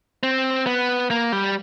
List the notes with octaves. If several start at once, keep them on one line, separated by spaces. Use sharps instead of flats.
C4
B3
A#3
G3